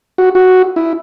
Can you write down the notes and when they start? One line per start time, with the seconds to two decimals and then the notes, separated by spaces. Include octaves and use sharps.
0.18 F#4
0.35 F#4
0.76 E4